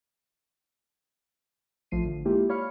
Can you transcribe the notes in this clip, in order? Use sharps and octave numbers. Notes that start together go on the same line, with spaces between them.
A1 F3 A3 C7 D#7
D3
G#3 A#3 E4 F4 G4
C#5 D5 F5 B5 F6 C#7